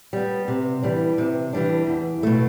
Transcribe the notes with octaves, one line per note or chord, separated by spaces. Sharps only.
G3 B3
C3
E3 G3 D4
C3
E3 G3 D4
E2
B2 A3